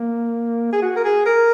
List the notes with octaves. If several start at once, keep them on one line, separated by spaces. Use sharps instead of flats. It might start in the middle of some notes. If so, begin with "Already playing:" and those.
Already playing: A#3
G#4
F#4
A#4
G#4
A#4